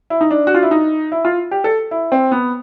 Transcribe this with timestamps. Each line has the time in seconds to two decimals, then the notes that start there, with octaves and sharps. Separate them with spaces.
0.10 E4
0.21 D#4
0.31 D4
0.47 F#4
0.55 F4
0.63 E4
0.71 D#4
1.12 E4
1.25 F4
1.51 G4
1.64 A4
1.91 E4
2.12 C4
2.31 B3